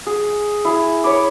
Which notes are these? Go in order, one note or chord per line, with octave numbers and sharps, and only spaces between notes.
G#4
E4 G#4
C#5 B5 D6